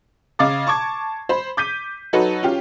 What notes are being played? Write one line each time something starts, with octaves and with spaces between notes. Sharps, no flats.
C#3 D#5 F5 D6 A6
A5 C#6 D6 G#6
C5 B5
D6 G6 B6 D#7
F#3 D#4 F#4 A4 B4 C#5
C#4 F4 G4